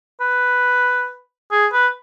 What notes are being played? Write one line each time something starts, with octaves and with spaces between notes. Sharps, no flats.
B4
G#4
B4